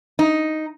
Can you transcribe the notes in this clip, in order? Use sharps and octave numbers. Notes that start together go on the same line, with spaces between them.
D#4